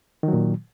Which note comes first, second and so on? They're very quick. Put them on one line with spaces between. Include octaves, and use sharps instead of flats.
D#3 F#3 A#2